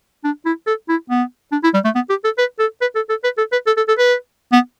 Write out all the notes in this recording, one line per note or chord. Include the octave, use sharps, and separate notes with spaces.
D4
E4
A4
E4
B3
D4
E4
G3
A3
B3
G4
A4
B4
A4
B4
A4
A4
B4
A4
B4
A4
A4
A4
B4
B3